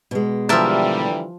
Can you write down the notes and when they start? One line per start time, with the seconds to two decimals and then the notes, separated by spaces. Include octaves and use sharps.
0.11 B2 G#3
0.49 D3 E3 F3 G3 A#4 E5 A5